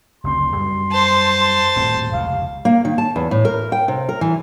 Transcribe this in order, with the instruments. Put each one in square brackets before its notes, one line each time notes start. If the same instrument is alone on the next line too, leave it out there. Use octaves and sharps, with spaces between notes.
[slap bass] F#1 D2 C4 [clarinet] C6
[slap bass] F#2 G3
[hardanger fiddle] C5 A5
[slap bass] D#1 A2 C4
[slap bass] F1 C#2 C#3 [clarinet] F5
[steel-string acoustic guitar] A#3
D#3
A5
E2
A2
A#4
G5
C3
A#4
E3